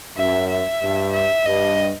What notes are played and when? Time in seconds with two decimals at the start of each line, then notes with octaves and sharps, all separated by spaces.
0.17 F#2 E5
0.50 E5
0.81 G2
1.13 E5
1.45 G2 D#5